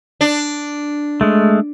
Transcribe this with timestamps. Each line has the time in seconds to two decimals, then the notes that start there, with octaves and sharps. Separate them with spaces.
0.21 D4
1.21 G#3 A3